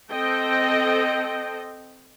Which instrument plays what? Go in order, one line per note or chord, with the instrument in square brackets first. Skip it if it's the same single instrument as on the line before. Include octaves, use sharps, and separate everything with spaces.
[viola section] C4 A4 D#5 G5